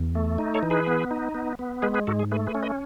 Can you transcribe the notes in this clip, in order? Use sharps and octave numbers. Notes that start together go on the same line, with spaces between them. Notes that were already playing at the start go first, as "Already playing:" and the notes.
Already playing: E2
A3
D#4
A4 C#5
E3
G#4 B4
B3
D#4
B3
B3
G#3 G#4 B4
G#4 B4
G#2 F#4 A4
G#4
A3 G#4 B4
G#4 B4
C#4
B4 D#5